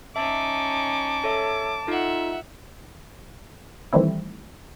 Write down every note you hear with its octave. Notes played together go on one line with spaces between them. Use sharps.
C#4 D#4 E5 A5 D6
A4 C#5 E5
D#4 F4 A4 E5 F#5
D#3 E3 G3 A3 C4 E4